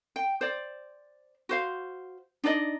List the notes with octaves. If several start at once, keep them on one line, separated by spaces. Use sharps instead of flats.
G5
C5 D5
F#4 C5 F5
D4 D#4 D5 D#5